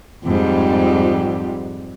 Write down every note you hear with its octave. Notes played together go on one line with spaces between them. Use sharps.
F2 G#2 G3